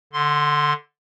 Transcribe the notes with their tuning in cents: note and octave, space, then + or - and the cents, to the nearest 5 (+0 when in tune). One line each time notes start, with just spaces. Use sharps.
D3 +0 C6 +0